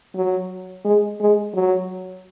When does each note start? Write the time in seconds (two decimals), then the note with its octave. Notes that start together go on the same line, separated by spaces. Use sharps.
0.15 F#3
0.85 G#3
1.20 G#3
1.54 F#3